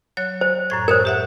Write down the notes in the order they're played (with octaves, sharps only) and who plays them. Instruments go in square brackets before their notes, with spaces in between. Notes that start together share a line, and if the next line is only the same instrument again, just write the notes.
[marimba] F#3 C#5 F#6
[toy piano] C5
[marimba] F#2 A2 G#6
[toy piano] A#4 C5 [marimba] C#5 D#6
[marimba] G4 E5 F#5